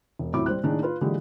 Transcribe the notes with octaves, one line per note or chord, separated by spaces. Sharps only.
E1
D#1 A2 C3 F#3 E4 D6
G3 C5 F#6
A2 D#3 A#3 D4 G#4
F4 B4
A#2 D3 E3 G#3 G4